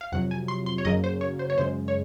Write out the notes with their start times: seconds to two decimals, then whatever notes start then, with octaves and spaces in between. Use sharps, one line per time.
0.01 F5
0.12 F2 C3 F#3 F#5
0.31 G#5
0.48 C6
0.66 C6
0.78 C#5
0.85 F#2 C#3 F#3 A#3 D#5
1.04 C5
1.21 C#5
1.39 C5
1.50 C#5
1.58 F#2 C#3 G#3 C5
1.88 C#5